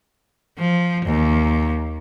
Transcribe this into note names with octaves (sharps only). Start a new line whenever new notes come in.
F3
D#2